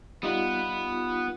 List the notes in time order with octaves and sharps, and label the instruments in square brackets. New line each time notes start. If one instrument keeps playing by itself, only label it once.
[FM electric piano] G3 D#4 F4 [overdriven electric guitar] B3 B4